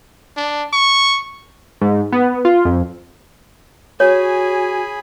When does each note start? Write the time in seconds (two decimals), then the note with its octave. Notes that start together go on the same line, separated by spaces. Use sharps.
0.37 D4
0.73 C#6
1.81 G#2
2.13 B3
2.45 F4
2.65 F2
4.00 F#4 G#4 C#5 G#5 B5